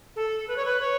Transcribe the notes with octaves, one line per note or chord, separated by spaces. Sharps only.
A4
B4
C#5
B4
C#5